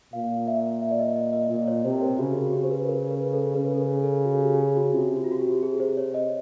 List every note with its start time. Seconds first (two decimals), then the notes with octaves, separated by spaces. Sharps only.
0.13 A#2 F5
0.47 E5
0.81 E5
0.91 D5
0.99 D#5
1.16 D#5
1.33 D#5
1.50 A#2 D#5
1.68 C#5
1.85 C3 C5
2.02 A#4
2.18 C#3 F#4
2.37 F#4
2.53 G4
2.63 C5
2.71 B4
2.88 A#4
3.11 B4
3.33 A4
3.56 C#3 B4
3.75 A4
3.80 A#4
4.02 A4
4.25 F#4
4.42 G4
4.59 G#4
4.77 F#4
4.93 C3 F4
5.17 F#4
5.24 F4
5.32 F#4
5.40 G4
5.52 G4
5.63 G#4
5.80 C5
5.97 C#5
6.14 D#5